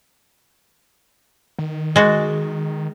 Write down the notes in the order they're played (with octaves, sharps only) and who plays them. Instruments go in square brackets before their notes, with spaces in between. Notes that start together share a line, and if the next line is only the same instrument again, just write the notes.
[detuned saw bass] D#3
[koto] G#3 F#4 [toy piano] G#4 D#5